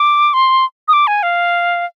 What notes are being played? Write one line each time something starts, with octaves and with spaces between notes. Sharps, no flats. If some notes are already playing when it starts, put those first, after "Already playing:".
Already playing: D6
C6
D#6
D6
G#5
F5